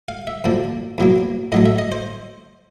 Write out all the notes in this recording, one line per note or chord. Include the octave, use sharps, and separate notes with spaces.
F5
E5
F#2 D3 F3 A#3
E2 B2 F#3 A#3
A2 F#3 A3 D#5
E5
D#5
C5